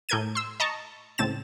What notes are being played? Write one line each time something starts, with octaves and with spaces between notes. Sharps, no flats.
A2 A4 A#4 G6 G#6 D#7
C6 E6
D#5 A5 A#5 C#6
C#2 A2 C4 A6 E7